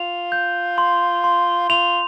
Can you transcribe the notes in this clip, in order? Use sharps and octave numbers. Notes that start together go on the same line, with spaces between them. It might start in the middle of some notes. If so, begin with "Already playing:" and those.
Already playing: F4 F7
G6
C6
C6
F4 F7